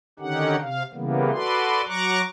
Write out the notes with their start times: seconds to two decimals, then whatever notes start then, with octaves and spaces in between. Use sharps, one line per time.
0.19 D3 D#3 C#4 D#4 G4 F#5
0.61 C3 F5
0.93 C#3 E3 G3 A#3 B3
1.32 F#4 A4 B4 D5 C6
1.87 F#3 A#5 C#6 D6 F#6